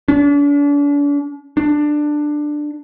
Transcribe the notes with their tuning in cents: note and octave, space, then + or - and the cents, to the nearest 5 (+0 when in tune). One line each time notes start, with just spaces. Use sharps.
D4 -40
D4 +15